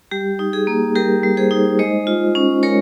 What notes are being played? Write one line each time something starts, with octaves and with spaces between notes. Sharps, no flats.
G3 G4
D#4
G#4
A#3
G3 G4 A#4
G3
G#4 C5
D#4
G#3 C5 D#5
F4
C#4
G#3 A#4 C#5